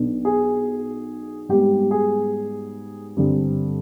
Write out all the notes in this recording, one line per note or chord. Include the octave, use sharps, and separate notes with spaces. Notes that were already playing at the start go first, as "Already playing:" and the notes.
Already playing: B1 B2 B3 D4
G#4
G#2 G3 B3 G4
G#4
G2 D3 G3 C4